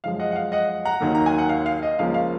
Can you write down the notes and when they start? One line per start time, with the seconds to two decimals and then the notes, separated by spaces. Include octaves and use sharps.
0.04 F#2 F3 G#3 F5
0.20 D#5 F#5
0.31 F#5
0.36 F5
0.52 D#5 F#5
0.85 F#5 A#5
1.01 D#2 D#3 F#3 A#3
1.15 A#5
1.26 G#5
1.38 F#5
1.49 F5
1.66 F5
1.82 D#5
1.99 C#2 C#3 F3 A#3 F5
2.14 F5